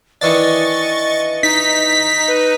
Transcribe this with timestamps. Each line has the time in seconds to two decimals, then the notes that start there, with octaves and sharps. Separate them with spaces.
0.21 D#3 E3 D4 D#5 C#6 A6
1.43 D#4 B6
2.28 B4